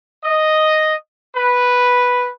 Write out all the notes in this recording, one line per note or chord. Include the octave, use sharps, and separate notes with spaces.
D#5
B4